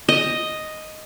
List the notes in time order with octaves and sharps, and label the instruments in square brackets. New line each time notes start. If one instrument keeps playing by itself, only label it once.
[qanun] D#5